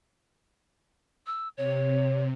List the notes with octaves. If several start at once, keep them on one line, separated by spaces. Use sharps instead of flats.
E6
C3 C#5